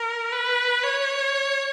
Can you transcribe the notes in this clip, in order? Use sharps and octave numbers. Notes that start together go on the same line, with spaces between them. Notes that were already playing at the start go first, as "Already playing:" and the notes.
Already playing: A#4
B4
C#5